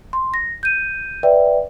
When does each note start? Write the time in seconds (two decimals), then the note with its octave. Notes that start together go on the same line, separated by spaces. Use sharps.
0.13 C6
0.34 A#6
0.63 G6 D#7
1.23 B4 D5 E5 G5